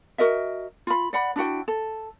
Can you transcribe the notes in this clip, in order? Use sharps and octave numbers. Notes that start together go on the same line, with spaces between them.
F#4 A#4 D#5 E5
F4 B5
D5 F#5 B5
D4 E4 F#4 G5
A4